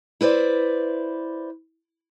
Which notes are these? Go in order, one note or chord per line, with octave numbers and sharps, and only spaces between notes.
E4 B4 C5 D5